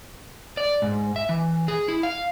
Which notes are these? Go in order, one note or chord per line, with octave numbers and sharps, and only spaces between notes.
D5
G#2
E5
E3
G#4
E4
F5